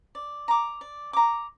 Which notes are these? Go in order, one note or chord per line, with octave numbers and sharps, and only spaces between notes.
D5
A#5 D6
D5
A#5 D6